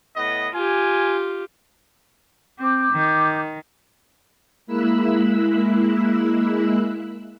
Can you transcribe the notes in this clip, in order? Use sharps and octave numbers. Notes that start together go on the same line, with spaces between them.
A2 B3 D#5
F4 G4 G#5
C4 D6 G6
D#3
G#3 A#3 E4 B5 E6 F#6